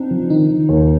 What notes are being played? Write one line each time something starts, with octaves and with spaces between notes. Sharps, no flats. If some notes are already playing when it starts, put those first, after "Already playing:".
Already playing: C4 D4 D#4
F3
D#3 D#4
D#3
D#2